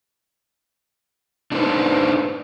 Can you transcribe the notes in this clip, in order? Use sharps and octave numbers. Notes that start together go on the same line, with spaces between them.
D4 D#4 F4 G#4 B4 C5